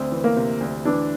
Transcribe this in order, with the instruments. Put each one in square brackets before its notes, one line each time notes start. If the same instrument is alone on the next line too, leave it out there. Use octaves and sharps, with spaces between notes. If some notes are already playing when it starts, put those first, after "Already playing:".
Already playing: [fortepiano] D2 [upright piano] C4
[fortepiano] E3
[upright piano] A#3
[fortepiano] C3
D2
[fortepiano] E3 [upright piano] D4